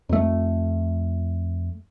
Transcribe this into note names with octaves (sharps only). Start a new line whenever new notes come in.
F2 A3